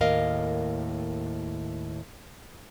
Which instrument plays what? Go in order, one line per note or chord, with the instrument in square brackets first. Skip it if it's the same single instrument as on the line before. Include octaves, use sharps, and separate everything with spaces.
[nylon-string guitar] D#2 A2 A#4 D#5 F5